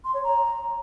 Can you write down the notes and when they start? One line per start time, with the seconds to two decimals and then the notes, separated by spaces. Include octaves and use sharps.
0.04 C6
0.14 C#5
0.23 A#5